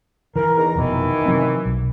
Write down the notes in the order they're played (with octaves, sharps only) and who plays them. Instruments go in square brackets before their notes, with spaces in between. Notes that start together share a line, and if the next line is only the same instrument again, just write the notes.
[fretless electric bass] E3 [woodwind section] A#4
[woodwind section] E2 D#3 A#5
[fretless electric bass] F1 B2 [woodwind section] D#3 E3
[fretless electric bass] C3 F#3 C4
B1